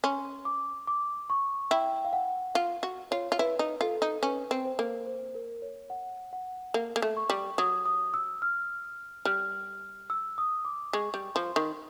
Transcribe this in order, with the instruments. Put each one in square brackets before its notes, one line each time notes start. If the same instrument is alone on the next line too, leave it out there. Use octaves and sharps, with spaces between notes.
[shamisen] C#4 [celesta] C6
[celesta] D6
D6
C#6
[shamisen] E4 [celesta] G5
[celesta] F5
F#5
[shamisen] F4 [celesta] F5
[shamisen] F#4
[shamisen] F4 [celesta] C#5
[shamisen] F4
[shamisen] E4 [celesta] B4
[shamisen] D#4
[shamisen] F4 [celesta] A4
[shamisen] D#4
[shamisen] C#4 [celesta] B4
[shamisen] C4
[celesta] C5
[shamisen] A#3
[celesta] C5
A#4
C#5
F#5
F#5
[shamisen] A#3
A#3
A3
[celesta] C#6
[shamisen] G3
[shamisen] F#3 [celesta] D#6
[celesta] D#6
E6
F6
[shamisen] G3 [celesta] F6
[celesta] E6
D#6
D6
[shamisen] G#3 [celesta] C#6
[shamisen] G3
[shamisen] F3 [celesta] C6
[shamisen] D#3